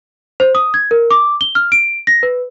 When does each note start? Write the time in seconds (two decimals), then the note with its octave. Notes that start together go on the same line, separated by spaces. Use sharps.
0.40 C5
0.55 D#6
0.74 G#6
0.91 A#4
1.11 D6
1.41 G7
1.55 F6
1.72 D7
2.07 A#6
2.23 B4